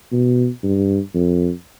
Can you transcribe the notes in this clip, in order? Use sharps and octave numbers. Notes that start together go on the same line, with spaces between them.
B2
G2
F2